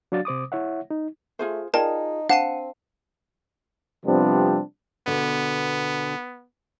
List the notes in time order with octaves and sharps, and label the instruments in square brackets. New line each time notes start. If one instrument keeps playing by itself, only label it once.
[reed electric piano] F#3 D4 F#4 D5 F5 A6
C3 C5 D6 D#6
E4 C#5 E5 F#5
D#4
[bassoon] A3 [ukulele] F4 G#4 C5
[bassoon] D#4 [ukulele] F4 G#4 [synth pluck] A#4 D5 G5 [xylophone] A5
[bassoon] C4 [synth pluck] D4 D#7 [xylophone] F5 A5 C7 [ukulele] F#5
[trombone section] C3 F3 G3 B3 C4 D4
[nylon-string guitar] B2 D3 [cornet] B3